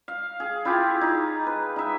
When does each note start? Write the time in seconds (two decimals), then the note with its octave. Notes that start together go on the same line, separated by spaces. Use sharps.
0.08 F5
0.40 G#4
0.65 E4 F4 G4 G#4
1.01 D#4
1.46 B4
1.76 D#4 E5